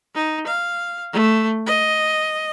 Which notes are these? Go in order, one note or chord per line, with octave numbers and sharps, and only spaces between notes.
D#4
F5
A3
D#5